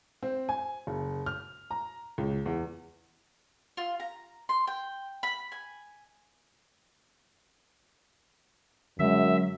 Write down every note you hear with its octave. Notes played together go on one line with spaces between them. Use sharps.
C4
G#5
F#1
F6
A#5
C#2
E2
F4
A#5
C6
G5
B5
G#5
F#2 D3 F#3 G#3 E5